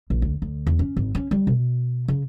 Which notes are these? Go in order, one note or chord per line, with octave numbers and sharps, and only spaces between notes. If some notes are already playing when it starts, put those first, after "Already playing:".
A#1
D2
D2
E2
C#4
G#1
C#4
G3
B2
C#3